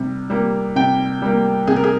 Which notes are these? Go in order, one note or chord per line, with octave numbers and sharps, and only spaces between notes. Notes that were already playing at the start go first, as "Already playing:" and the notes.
Already playing: C3 G3
G3 A#3
C3 G5
G3 A#3
C3 G#4
A#4
G#4